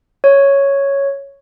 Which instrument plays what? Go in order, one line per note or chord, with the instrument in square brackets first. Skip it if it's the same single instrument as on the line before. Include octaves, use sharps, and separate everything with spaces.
[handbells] C#5